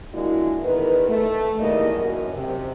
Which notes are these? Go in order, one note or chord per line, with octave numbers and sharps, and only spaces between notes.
A#2 D3 G#3 E4 F#4
E2 D#3 A#4 B4
A3
E2 D#3 G3 A#3 D#5
F#2
C3